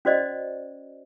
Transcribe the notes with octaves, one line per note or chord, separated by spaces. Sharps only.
C#4 F#4 C5 D5 D#5